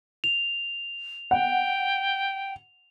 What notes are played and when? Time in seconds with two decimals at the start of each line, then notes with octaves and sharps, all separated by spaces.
0.24 F7
1.31 F#5 G5